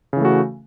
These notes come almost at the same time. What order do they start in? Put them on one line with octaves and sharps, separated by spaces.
C#3 E3 A3 F#4